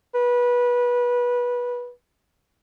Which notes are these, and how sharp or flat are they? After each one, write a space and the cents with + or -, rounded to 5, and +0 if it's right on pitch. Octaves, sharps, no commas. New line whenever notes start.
B4 -20